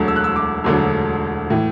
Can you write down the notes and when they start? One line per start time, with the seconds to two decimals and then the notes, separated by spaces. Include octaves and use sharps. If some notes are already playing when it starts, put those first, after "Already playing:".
Already playing: E1 D2 D3 F#3
0.08 E6
0.16 F#6
0.24 E6
0.36 D6
0.64 E1 D2 D3 F#3
1.50 A2 E3